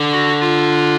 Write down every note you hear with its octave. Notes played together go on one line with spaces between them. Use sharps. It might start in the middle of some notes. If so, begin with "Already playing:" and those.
Already playing: D3
F#4
F4